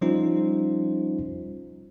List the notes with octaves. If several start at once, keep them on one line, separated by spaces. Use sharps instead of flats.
F3 G3 C#4 D#4 F4 C5